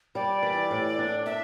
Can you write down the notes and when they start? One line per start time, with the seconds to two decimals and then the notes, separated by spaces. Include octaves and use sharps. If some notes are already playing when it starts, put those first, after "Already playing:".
0.15 G3 D5
0.43 E3
0.71 A2
0.99 D4
1.26 D4 E5